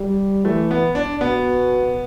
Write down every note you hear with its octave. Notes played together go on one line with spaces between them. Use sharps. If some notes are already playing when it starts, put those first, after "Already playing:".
Already playing: G3
E3 A3
B3
D4
B2 B3